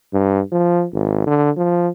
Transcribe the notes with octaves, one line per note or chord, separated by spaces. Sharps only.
G2
F3
G#1
D3
F3